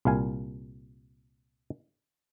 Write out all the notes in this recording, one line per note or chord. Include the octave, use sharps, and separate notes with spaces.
C2 A#2 F5 G#5